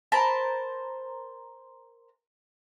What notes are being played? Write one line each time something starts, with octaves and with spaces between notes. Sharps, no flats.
A#4 C5 A5 B5